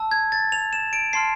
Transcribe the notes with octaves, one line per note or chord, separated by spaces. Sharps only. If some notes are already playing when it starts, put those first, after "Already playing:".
Already playing: A5 E6
G#6
A6
F7
E7
D7
A5 C6 F6 C7